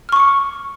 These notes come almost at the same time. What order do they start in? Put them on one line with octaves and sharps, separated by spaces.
F6 C#6 D6 C#7